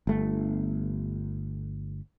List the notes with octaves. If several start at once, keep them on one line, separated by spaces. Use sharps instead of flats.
G1 A3